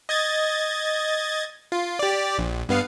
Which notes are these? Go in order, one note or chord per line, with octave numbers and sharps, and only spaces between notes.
D#5 G#6 A6
F4
G4 D5
A#1
G2 B3 F5